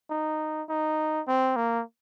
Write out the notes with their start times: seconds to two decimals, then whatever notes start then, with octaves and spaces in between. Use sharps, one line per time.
0.10 D#4
0.69 D#4
1.28 C4
1.56 A#3